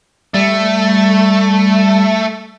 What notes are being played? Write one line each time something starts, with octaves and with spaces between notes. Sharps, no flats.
G3 A3